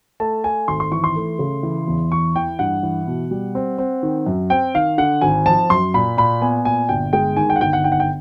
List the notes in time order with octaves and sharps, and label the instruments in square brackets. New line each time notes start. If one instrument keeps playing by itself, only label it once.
[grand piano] A3 A5
A3 G#5
G#1 C6
C6
E3 C#6
C6
A3
C#3
E3
E2
E3 C#6
E3 G5
G2 F#5
E3
B2
G3
C4
C4
D#3
F#2
C4 G5
D#3 F5
D3 F#5
G#1 G#5
F3 A5
F#2 C6
A#2 B5
A#2 B5
B3 G#5
A#2 G#5
G1 G5
G#3 G5
D#3 G#5
G5
F#5
G1 G5
F#5
D#3 G5
F#5
G5